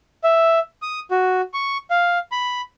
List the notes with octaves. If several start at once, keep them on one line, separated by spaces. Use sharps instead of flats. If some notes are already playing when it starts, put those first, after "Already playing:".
E5
D#6
F#4
C#6
F5
B5